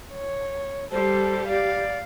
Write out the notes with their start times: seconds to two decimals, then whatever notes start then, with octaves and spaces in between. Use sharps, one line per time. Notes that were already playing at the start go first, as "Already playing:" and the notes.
0.14 C#5
0.91 G3 G4 A4 C5
1.48 D5 F5